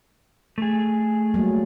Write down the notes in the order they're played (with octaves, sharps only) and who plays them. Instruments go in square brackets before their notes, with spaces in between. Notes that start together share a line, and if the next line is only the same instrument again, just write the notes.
[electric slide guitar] A3 G#4
[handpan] F#3 G3 A#3